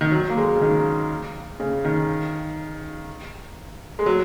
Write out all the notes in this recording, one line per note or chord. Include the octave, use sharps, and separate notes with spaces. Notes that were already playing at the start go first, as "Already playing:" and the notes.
D#3
F#3
A#3
G#3
C#3
D#3
C#3
D#3
G#3
F#3